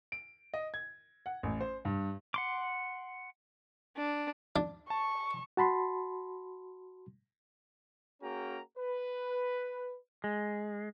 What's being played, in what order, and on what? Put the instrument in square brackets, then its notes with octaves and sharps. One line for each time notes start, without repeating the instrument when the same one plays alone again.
[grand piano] D7
D#5
G#6
F#5
A1
C5
G2
[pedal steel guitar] F#5 C6 D6
[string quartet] D4
[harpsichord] D4
[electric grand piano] A5 [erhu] C#6
[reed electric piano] F#4 A5 B5 C6
[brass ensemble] A#3 C#4 F#4 G#4 G5 A#5
B4
[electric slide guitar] G#3